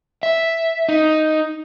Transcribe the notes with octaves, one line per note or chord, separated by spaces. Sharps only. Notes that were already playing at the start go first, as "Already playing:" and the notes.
E5
D#4